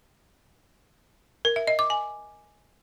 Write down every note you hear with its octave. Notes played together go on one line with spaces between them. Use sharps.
A#4
E5
D#5
D6
G#5